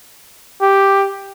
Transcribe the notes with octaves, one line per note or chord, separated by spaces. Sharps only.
G4